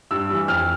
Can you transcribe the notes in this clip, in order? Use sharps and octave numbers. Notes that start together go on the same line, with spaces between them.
G2 E6
E3 G3
F2 F6